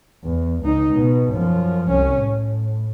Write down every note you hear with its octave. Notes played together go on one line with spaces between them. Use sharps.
E2
C#2 D#4
B2
F#2 F3
C2 C#4
A2